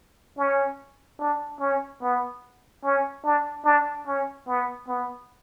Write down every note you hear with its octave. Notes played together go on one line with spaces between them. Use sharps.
C#4
D4
C#4
B3
C#4
D4
D4
C#4
B3
B3